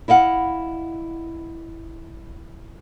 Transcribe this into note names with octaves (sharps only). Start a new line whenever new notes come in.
E4 D#5 F5 F#5